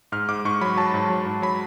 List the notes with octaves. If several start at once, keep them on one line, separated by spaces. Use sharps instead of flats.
G#2 F6
G#2 D6
G#2 C#6
F#3 B5
F#3 A5
G#2
F#3
G#2
F#3 B5